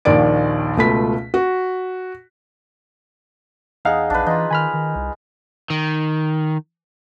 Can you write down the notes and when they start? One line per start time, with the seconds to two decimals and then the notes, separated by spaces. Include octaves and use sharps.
0.05 A#1 D#2 D#3 D5 D7
0.77 C#2 B2 A3 F4 B5 B6
1.34 F#4
3.85 E2 D#4 G#4 F5 F#5
4.10 A#1 D4 B4
4.26 E3 D#4 F4
4.51 D#3 G#5 B5 F6
4.74 D#3
4.95 C2
5.70 D#3